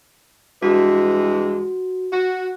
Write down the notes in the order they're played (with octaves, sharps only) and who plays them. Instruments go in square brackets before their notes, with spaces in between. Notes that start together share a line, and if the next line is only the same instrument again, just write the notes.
[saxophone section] G2 E3 G#3 [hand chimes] F#4
[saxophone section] F#4